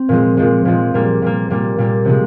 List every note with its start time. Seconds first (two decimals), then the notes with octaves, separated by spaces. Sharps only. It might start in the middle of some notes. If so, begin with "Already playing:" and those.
Already playing: C4
0.09 A#2 F3 G#3
0.37 A#2 F3 G#3
0.65 A#2 F3 G#3
0.94 A#2 G3 A#3
1.22 A#2 G3 A#3
1.50 A#2 G3 A#3
1.78 A#2 G3 A#3
2.05 C3 F3 G#3